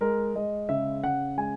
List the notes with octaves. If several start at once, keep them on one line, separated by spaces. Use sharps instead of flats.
G#3 A#4
G#3 D#5
C#3 E5
C#3 F#5
G#3 G#5